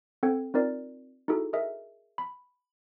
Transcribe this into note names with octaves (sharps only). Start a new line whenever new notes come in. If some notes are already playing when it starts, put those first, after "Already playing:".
C4 A4 F#5 G5 G#6
C4 D#4 F4 A#4 D5
D#4 E4 F#4 G#4 A4
G#4 A#4 D#5 E5
B5